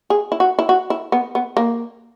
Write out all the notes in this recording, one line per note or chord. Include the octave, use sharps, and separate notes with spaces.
G#4
E4
F#4
E4
F#4
E4
B3
B3
A#3